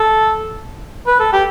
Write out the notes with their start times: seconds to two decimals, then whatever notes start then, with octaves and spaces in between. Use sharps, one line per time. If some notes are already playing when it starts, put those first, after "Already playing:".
Already playing: A4
1.07 B4
1.20 A4
1.33 G4